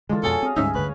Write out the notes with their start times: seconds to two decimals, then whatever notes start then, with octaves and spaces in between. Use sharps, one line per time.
0.09 D3 E3 G#3 D4 F4 A4
0.23 F2 B2 F#3 G#4 A4 G#5
0.43 C4 G#4 D#5 F5
0.56 D2 G#2 G3 C#4 D#4 E5
0.75 D2 G2 D3 B4 C#5